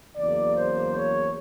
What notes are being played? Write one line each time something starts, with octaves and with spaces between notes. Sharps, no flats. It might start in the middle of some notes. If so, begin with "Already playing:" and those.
E2 C#3 F#3 A#3 D5
C5
C#5